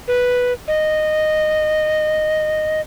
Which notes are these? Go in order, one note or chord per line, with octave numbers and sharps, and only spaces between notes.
B4
D#5